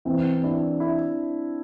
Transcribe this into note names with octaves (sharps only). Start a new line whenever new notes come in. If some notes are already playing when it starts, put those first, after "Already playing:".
E3 C4
D4 E4
E4